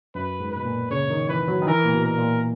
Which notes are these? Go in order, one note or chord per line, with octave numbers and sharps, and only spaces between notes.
F#2 B4
G#2
B2 B4
A#2
C#3 C#5
D#3
E3 B4
F#3
D#3
E3 A#4
A#2
B2
A#4
A#2